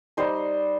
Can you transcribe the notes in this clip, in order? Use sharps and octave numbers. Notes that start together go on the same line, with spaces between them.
G3 D#4 C5